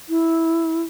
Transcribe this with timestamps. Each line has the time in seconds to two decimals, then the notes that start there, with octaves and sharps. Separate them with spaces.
0.09 E4